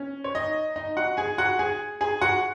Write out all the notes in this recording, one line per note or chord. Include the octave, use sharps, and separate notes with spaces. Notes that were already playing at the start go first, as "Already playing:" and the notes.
Already playing: C#4
C#5
D#4 D#5
D#4 D#5
F#4 F#5
G#4 G#5
F#4 F#5
G#4 G#5
G#4 G#5
F#4 F#5